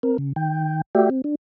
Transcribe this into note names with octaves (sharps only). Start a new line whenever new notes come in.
C4 A#4
C#3
D#3 G5
A3 F#4 G4 D5 E5 G5
C4
D4